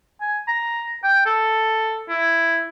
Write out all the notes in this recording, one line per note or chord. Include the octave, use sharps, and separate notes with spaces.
G#5
A#5
G5
A4
E4